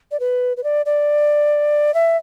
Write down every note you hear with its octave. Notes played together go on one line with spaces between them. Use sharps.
D5
B4
B4
D5
D5
E5